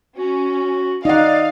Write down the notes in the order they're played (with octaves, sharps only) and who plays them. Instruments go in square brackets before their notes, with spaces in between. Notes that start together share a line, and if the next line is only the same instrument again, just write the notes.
[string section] C#4 [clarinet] F#4
[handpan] D#4 F#5 [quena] D5 [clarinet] D#5 [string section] F5